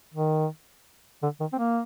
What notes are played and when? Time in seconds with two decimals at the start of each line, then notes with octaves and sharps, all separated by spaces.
0.14 D#3
1.23 D3
1.40 D#3
1.53 C4
1.58 A#3